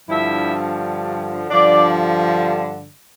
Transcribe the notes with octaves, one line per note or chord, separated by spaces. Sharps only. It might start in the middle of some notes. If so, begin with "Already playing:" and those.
G2 D3 F3 E4 E5
G2 D3 F3 D4 D5